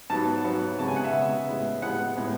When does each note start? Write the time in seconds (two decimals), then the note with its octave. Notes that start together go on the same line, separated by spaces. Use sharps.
0.10 G#2 F#3 B3 A5
0.44 G#2 F#3 B3
0.79 C#3 G#3 B3 A5
0.88 G#5
0.96 F#5
1.04 E5
1.13 C#3 G#3 B3
1.47 A2 G#3 B3
1.82 A2 G#3 B3 F#5
2.17 A2 G#3 B3